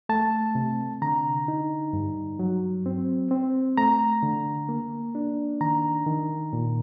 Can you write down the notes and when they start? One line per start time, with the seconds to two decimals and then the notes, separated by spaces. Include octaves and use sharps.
0.09 A3 A5
0.55 C3
1.02 D3 A#5
1.48 D#4
1.93 G2
2.39 F#3
2.86 C4
3.31 C4
3.78 A3 A#5
4.23 D3
4.69 A#3
5.15 D4
5.61 D#3 A#5
6.07 D#3
6.53 A#2